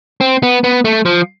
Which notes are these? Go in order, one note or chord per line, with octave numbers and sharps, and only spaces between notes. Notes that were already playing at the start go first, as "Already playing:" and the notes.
C4
B3
B3
A3
F3